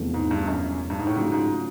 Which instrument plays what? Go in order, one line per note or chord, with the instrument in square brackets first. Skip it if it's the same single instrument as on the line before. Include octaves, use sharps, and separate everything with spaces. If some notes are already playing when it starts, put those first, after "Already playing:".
Already playing: [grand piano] E1 E2 C3 F3 A3
[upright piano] G#2
G2
F#2
G2
G#2
A2
[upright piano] G#2 [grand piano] C#3 F#3 A3 D4 F4
[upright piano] G#2